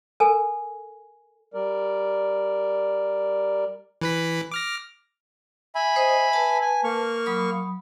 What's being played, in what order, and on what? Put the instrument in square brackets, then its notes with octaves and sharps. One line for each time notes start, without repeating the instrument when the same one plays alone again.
[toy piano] A4 A#4 G#5
[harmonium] G3 A#4 D5
[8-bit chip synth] E3 B4 B6
D6 F6 A#6
[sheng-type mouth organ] E5 G#5 B5
[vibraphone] C5 D#5 D#6
B4 A5
[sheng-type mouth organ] G#5
A#3 C#6 F6
[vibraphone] F#3 B5 D#6